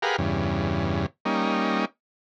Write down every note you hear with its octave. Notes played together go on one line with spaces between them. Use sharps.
G4 G#4 A#4 B4 F5 F#5
E2 G2 C#3
G3 A#3 C#4 D#4